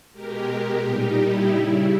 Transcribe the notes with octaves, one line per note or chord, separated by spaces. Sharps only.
B2 G#3 G4 A#4
G4 A#4
A#2 G3 D#4 G4
E4
C#3 G3 E4